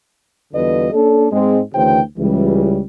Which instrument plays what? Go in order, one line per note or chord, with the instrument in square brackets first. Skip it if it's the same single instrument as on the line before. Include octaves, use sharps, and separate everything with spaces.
[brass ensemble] E2 D3 G3 F4 B4 D#5
A#3 C#4 D4 A4
G#2 G#3 C4
D2 C#3 E3 F#4 C5 G5
C#2 E3 G3